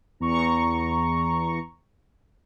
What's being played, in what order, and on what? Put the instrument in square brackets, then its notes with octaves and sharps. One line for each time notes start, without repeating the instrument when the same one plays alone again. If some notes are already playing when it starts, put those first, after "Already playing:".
[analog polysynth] E2 A#5 C#6